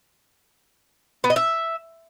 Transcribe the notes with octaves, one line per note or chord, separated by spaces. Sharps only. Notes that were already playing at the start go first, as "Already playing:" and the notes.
B3
D#5
E5